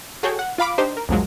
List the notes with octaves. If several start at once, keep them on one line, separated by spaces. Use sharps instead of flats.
F#4 G#4 A4 C#5 G5
F#5
F4 F5 B5 D6
D4 D#4 G4 C5
A#4
C2 F2 A#2 F3 F#3 G#3